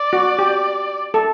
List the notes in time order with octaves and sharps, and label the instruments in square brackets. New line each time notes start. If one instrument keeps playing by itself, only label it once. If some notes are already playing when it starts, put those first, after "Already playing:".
Already playing: [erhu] D5
[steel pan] F#4
G4
A4